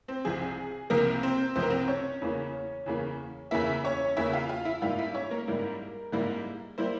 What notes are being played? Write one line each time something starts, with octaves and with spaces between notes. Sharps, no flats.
C4 C5
C2 C3 F3 C4 G#4
C2 C3 F3 A#3 C4 A#4
C4 C5
C2 C3 F3 C4 C5
A#4
C4 C5
C#4 C#5
E2 C#3 E3 A#3
E2 C#3 E3 A#3
E2 C#3 E3 A#3 E4 E5
C#4 C#5
E2 C#3 E3 A#3 E4 E5
F4 F5
F4 F5
E4 E5
G#2 G3 A#3 E4 F4 F5
E4 E5
C#4 C#5
A#3 A#4
G#2 G3 A#3 E4
G#2 G3 A#3 E4
G3 A#3 E4 C5